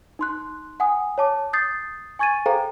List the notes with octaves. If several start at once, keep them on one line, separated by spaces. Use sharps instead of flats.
D#4 C6 F#6
F#5 G#5 D#6
C#5 A5 D6
D#6 G6 A6 C7
G#5 C#6 G#6 A6 D#7
G#4 A4 C5 F5 G5 A#5